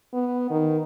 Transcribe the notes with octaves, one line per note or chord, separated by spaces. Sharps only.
B3
D#3